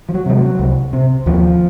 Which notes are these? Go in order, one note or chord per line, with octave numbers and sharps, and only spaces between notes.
F3
F#3
C3 G#3
F#3
C2
C3
D#2 F3